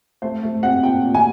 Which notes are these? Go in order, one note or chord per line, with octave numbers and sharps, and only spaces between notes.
A3 C5
A3
C4 F#5
A#2 G5
A#2
G#5